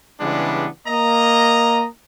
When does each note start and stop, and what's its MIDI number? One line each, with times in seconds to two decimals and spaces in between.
0.20 0.67 49
0.20 0.67 52
0.20 0.67 55
0.20 0.67 56
0.20 0.67 59
0.20 0.67 62
0.87 1.85 58
0.87 1.85 75
0.87 1.85 82